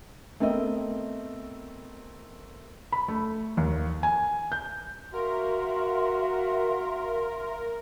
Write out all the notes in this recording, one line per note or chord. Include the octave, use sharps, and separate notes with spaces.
A3 B3 C4 A#4 D#5 E5
B5
A3
D#2
G#5
G6
F#4 A#4 E5 F5 C6